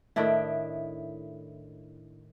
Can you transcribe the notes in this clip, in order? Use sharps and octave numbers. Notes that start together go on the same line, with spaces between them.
A2 D#3 D4 E4